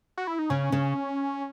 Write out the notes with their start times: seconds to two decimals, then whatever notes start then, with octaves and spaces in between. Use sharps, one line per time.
0.17 F#4
0.27 E4
0.39 D#4
0.50 C#3 C#4
0.72 C#3